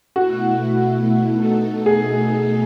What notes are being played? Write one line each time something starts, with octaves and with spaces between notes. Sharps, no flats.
B2 A3 E4 F#4
B2 A3 D#4 A4
G#4